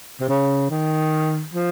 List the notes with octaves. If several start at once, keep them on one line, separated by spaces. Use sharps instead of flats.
C3
C#3
D#3
F3